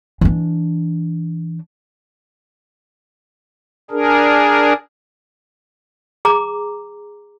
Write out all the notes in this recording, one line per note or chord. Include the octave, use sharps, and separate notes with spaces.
E3 D4
D4 G#4 A#4
G#4 A#5 D6